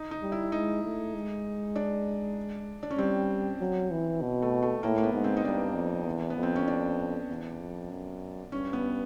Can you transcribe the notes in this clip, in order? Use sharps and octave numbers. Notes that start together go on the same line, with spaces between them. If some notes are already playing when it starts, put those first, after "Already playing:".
Already playing: D#4
D#4
G3
E4
G#3 D#4
A3
G#3
D4
D4
C#4
G3 C4
F#3
E3
B2
A3
A3
A2 A#3
A#3
B3
G#2
C4
D#4
G2 D4
F2
E2
B3
F2
C4
C#4
D4
E2
F2
F#2
G2 C#4
B3